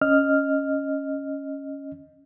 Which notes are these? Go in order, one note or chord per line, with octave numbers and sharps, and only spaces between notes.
C#4 D#5 F6